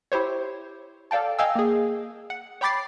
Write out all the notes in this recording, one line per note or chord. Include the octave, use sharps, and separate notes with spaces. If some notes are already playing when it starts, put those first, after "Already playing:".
E4 G4 C5 C#5
A4 D5 F5 G5 A5
D#5 F5 G5 G#5 E6
A#3 G#4
F#5
C#5 G5 B5 D6 A6 C7